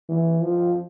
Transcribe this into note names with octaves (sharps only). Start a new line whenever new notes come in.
E3
F3